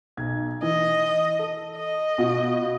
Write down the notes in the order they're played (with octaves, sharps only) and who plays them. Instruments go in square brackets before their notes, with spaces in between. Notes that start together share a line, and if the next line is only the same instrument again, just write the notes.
[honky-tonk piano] B1 G#6
[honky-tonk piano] E3 [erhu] D#5
[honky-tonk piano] A4
[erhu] D#5
[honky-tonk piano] B2 F4 F#4